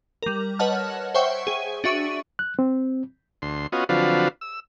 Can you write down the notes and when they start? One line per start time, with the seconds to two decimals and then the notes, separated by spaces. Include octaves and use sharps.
0.22 G3 A#4
0.59 B4 C#5 D#5 F#5 A5 F6
1.14 C5 C#5 E5 F#5 G5 C#6
1.47 G#4
1.84 D4 F#4 E5 C#6 D#7
2.39 F#6
2.59 C4
3.42 D2 C6
3.72 B3 C#4 F4 F#4 D#5
3.89 D3 F3 F#3 C4 F4 B4
4.41 E6